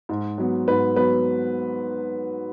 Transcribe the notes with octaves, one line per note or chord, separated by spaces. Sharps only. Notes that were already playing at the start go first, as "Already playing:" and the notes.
G#2
F#3 B3
G#2 B4
F#3 B3 B4